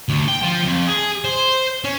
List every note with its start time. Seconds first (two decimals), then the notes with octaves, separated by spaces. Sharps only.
0.09 D2
0.28 G5
0.43 F3
0.66 F2
0.88 G#4
1.24 C5
1.84 C#4